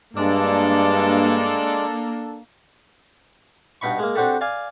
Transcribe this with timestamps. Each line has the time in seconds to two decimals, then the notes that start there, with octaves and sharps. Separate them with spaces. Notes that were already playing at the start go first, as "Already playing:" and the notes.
0.16 G2 G#3 A#3 D4 A4 D5
3.81 G2 B2 D#4 B5 C#6
3.99 G#3 A#3
4.16 C4 D4 F#4 G4 A4
4.41 D5 F5 G#5